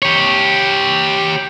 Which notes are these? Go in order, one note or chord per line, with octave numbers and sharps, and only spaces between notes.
G4 C#5